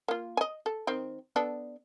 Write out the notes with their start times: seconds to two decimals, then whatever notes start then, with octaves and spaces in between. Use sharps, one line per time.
0.08 A#3 F4
0.37 D#5 G#5
0.66 A4
0.87 D#3 C4 G5
1.36 B3 D4 A4